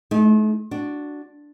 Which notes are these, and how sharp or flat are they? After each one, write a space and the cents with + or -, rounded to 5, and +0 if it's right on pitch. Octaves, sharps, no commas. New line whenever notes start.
A3 -40 D#4 +5
D4 +0 F#4 +0